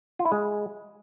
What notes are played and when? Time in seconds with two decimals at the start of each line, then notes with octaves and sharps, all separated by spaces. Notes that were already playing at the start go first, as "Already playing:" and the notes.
0.19 F4
0.26 E4
0.32 G#3